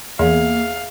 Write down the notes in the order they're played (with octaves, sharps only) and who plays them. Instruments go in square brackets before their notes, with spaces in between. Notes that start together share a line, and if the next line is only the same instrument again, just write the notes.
[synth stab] E2 [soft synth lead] A#3 [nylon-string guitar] G#4 E5 [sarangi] F5